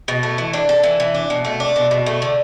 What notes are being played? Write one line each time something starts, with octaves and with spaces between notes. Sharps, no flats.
B2
A3
E3
D4
A4
E3
E3
D4
B2
A3
D4
B2
B2
A3
D3